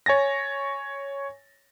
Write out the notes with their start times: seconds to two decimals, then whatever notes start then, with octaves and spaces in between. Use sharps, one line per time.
0.06 C#5 G#5 A6 A#6